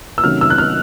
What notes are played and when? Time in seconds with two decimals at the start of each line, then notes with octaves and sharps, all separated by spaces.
0.18 E6
0.23 C3 D#3 F#3 A3 C#4 F6
0.41 E6
0.50 F#6
0.58 F6